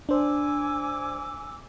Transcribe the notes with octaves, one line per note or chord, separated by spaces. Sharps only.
D4 C5 G#5 D6 E6